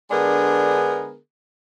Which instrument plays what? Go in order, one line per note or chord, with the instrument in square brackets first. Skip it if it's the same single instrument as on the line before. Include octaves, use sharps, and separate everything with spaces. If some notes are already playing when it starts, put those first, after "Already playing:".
[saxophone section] D3 G#3 B3 D4 G#4 A#4